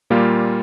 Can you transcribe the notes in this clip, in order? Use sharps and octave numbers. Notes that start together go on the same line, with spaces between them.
A#2 G3 A#3 F4